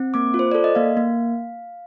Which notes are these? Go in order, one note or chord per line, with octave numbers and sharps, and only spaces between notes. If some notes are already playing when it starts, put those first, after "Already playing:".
Already playing: C4
A#3 D6
F4
C5
A4 D5
D#5
A#3 F5
A#3